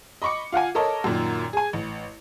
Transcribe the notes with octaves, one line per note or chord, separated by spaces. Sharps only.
D#5 B5 C#6 D6 C#7
F4 F5 F#5 G#5
A4 A#4 C#5 D#5 A5
F#2 A#2 D#3
G#4 G#5
A1